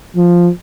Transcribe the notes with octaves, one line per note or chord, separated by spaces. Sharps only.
F3